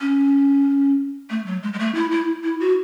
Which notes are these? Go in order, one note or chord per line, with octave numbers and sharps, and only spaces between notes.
C#4
A3
F#3
G#3
G#3
A3
E4
E4
E4
F#4